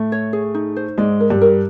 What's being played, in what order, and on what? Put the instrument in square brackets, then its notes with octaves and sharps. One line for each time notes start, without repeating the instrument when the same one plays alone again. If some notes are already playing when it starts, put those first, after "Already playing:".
Already playing: [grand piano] A2 A3
[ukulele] C#5
G#4
D#4
C5
[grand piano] G#2 G#3 [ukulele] D5
[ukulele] A#4
[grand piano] G2 G3
[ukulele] A#4